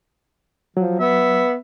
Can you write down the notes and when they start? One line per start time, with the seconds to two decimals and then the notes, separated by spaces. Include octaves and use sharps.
0.77 F3 F#3
1.00 B3 E5